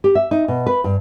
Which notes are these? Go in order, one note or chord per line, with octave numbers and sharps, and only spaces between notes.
G4
E5
D#4
B2
B4
G2